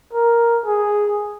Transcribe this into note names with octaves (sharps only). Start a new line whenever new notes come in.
A#4
G#4